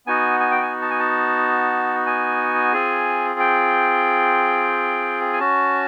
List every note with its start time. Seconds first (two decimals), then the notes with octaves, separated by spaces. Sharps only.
0.06 B3 D#4 F#4 G#5
0.40 G#5
0.51 G5
0.62 G#5
0.82 A5
0.91 G#5
0.99 A5
2.06 G#5
2.73 C4 F4 G#4
3.40 G5
5.33 G#5
5.39 C#4 F#4 A5